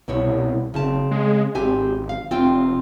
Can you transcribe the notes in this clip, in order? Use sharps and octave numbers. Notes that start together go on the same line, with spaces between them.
C2 B2 E4 C#5
F#1 C#3 C4 A5
G#3
G#1 C4 G4 G#5
F5
F1 C4 F4 G5